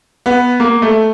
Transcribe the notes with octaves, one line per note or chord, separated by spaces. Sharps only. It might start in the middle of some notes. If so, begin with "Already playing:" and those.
B3
A#3
A3